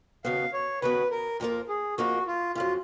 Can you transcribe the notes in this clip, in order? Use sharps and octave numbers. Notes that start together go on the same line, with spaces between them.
D#2 C#3 F#3 B3 F5
C#5
D#2 C#3 F#3 B3 B4
A#4
F2 F3 A#3 F4 A#4
G#4
F2 F3 A#3 F4 F#4 A#4
F4
F2 C#3 F#3 F4